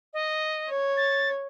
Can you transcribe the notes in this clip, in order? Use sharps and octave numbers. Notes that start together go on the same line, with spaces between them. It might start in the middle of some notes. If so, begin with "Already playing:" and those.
D#5
C#5
A6